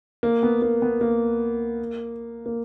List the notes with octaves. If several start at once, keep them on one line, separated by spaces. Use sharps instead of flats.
A#3
B3
A#3
B3
A#3
A#3